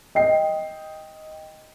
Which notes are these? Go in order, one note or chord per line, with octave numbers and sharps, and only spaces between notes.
D#5 G5 C7